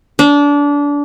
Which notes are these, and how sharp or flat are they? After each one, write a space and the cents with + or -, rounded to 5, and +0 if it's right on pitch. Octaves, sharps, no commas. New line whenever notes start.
D4 -25